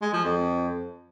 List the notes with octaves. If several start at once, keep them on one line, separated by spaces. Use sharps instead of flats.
G#3
F3
F2